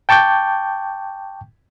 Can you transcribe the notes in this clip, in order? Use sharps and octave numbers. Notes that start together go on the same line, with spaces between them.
G5 A5 C#6 D6 G6